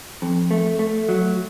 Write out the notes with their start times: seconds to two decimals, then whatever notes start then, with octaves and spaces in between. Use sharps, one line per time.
0.22 F2
0.51 A3
0.79 A3
1.09 F#3